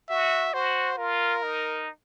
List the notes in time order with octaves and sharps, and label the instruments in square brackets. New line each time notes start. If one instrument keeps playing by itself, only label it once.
[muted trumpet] F#4 [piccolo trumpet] E5
[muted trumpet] F#4 [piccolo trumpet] C5
[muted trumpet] F4 [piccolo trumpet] A#4
[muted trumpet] D#4